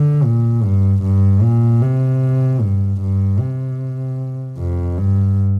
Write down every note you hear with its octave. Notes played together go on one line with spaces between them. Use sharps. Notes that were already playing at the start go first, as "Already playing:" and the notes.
Already playing: D3
A#2
G2
G2
A#2
C3
G2
G2
C3
F2
G2